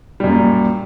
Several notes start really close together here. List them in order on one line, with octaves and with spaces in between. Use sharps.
G3 F#2 A#2